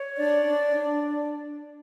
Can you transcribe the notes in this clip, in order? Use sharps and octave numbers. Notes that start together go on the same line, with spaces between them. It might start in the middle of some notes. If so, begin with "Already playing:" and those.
Already playing: C#5
D4 D5
D4
D4